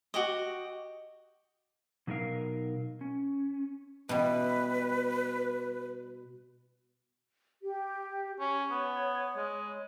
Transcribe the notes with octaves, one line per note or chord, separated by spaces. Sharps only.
F#4 G4 D#5
B2 F#3 D#4 G#4 A#4 F5
C#4
B2 E3 G3 B4
G4
C#4 C#5
B3
G#3